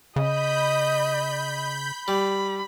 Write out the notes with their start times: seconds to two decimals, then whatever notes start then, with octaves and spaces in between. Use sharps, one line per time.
0.16 C#3 D#5 B5 G6
2.08 G3 B5